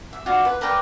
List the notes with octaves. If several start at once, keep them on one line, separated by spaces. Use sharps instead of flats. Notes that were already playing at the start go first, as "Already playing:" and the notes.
E5
F4 F#4 D5 F5
B4
A#4 B4 D5 G5